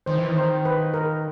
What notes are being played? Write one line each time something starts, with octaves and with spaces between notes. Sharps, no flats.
D#3 C5
E3
D#3
C5
B4
A#4